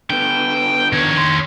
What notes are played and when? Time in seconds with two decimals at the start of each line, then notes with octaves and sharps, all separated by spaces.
0.10 D3 B3 G5
0.93 D#3 C#5
1.17 C6